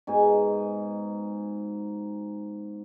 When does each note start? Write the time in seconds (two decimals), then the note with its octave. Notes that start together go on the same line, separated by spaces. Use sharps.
0.07 G#2 B2 D#4 G#5